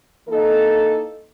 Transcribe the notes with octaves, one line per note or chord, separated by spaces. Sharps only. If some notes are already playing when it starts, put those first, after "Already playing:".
E3 A#3 D#4 A4